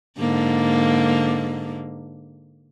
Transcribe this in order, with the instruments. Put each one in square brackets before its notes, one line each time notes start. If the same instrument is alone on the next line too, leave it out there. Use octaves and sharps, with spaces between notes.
[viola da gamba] G#2 D3 A#3